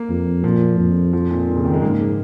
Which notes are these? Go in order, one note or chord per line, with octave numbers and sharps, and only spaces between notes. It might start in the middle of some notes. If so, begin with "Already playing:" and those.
Already playing: A#3
F2
A#2 F3
F2
F3
A#2
A#2
C#3
D#3
G#3
G#2 A#3